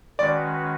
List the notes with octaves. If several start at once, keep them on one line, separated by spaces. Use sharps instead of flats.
D#3 G#3 C#4 F#4 B4 D5